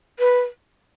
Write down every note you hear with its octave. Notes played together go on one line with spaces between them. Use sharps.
B4